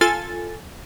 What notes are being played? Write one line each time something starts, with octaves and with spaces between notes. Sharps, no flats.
F4 A4 G#5 A6